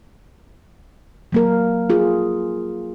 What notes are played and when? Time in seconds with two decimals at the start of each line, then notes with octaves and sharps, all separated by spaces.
1.32 F#3 A#3 A#4
1.90 F4 G#4